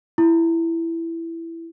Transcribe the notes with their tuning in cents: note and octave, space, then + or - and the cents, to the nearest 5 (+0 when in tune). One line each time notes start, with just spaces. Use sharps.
E4 +10